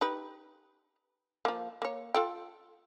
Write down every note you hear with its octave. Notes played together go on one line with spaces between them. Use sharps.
D#4 G4 B4
F3 A#3
A#3 C#5
F4 A4 G5